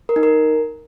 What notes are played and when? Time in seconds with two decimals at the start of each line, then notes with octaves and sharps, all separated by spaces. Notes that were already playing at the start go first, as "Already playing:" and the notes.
0.09 A#4
0.16 D#4
0.23 A#4